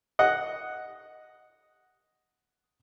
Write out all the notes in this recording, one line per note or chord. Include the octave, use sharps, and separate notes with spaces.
D#5 F#5